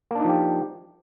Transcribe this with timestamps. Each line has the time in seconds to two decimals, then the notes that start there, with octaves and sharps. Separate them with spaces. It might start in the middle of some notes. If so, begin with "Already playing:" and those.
0.11 A#3
0.15 D4
0.20 D#4
0.24 F3
0.29 G4